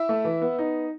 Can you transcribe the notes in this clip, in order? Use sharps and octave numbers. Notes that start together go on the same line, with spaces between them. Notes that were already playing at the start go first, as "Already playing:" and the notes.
Already playing: E4 E5
A3
E3
B3
D#4